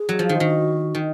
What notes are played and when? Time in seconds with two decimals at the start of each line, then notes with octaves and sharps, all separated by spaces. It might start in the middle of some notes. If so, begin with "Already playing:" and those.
Already playing: G#4
0.09 F#3
0.19 F3
0.29 D#3
0.35 F4
0.40 D#3 F#4
0.95 D#3